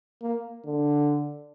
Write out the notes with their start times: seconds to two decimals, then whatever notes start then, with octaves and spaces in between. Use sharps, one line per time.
0.22 A#3
0.66 D3